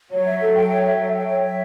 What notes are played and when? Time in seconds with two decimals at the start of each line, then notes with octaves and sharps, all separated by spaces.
0.11 F#3 C#5
0.26 E5
0.41 A4
0.56 G5
0.70 C#5
0.85 E5
0.99 A4
1.14 G5
1.29 C#5
1.43 E5